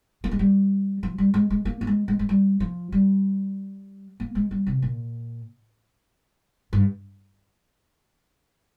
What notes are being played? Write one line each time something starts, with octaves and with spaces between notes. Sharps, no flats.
A#3
G#3
G3
F3
G3
G#3
G#3
A#3
A#3
G#3
G#3
G#3
G3
F3
G3
A#3
G#3
G3
C3
A#2
G2